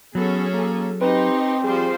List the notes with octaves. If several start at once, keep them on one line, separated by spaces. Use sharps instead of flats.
F#3 B3 C#4 G#4 A4
A#3
C4 D#4 G4 B4 C6
F3 G3 G#4 C5